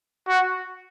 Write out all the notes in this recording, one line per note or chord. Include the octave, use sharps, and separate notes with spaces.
F#4